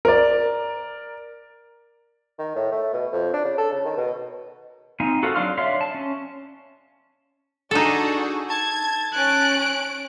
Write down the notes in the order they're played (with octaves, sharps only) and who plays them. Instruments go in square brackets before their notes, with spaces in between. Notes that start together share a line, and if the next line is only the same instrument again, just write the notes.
[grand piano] A#4 D5
[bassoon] D#3
A2
A3
B2
F2
D4
C#3
A4
C#3
D#3
B2
[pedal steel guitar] C4 D#4 F5 G#5
F#4 A4 A#4 C5 F5
F#3 D4 F5 C6 F6
C#5 D5 E5 F5 C6
A5
C#4
[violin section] D4 F#4 G#4 [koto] D#4 A4
[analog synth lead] A5 [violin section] G#6
[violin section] C#4 D7 [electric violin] F#6